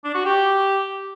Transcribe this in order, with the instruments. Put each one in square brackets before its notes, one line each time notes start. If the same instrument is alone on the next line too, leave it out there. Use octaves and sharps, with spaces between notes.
[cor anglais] D4
F#4
G4